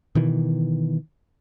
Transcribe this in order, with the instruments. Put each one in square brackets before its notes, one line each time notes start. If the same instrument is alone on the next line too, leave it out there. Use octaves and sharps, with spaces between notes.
[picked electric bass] B2 D#3 E3